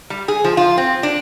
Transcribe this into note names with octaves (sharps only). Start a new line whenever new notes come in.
G3
G#4
F3
F4
C4
D4